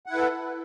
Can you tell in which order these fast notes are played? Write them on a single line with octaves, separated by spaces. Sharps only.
F#5 E4 B4 A4